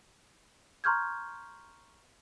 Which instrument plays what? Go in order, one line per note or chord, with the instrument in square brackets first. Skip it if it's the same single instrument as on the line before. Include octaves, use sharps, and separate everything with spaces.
[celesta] A#5 C6 C#6 F6 G6 G#6